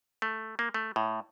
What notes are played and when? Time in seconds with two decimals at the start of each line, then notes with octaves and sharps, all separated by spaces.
0.22 A3
0.59 A#3
0.74 A3
0.96 A2